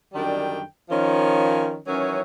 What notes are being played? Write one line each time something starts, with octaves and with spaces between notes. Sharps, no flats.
F#2 D3 D#3 G3 D4 G5
D#3 F3 C#4
D#3 E3 F#3 C#4